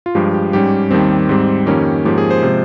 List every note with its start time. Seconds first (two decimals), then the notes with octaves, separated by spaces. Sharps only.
0.06 F4
0.15 G2 F3 G#3 G4
0.34 G4
0.53 G#2 G3 C#4 G4
0.91 D#2 D#3 G3 C4
1.29 G#2 G3 C4
1.67 F2 D#3 A#3 C#4 G4
2.05 G#2 F3 A#3 C#4 G4
2.18 G#4
2.31 C5
2.42 C3 F3 G#3